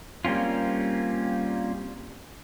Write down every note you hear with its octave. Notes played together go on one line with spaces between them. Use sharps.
G3 A#3 C4 C#4 F4